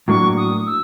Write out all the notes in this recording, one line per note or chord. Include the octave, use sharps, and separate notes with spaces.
A2 F#3 A#3 D4 C#6
D#6
E6